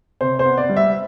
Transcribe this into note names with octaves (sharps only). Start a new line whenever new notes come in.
C3 C5
C5
B3
D5
G3
E5